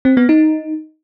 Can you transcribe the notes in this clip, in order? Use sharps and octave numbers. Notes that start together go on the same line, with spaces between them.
C4
B3
D#4